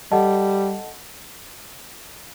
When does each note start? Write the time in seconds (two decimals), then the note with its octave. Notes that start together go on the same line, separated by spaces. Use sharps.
0.12 G3 A4 D#5 F#5 A5